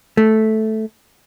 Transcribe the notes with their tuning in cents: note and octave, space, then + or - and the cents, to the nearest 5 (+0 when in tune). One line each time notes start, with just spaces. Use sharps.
A3 -5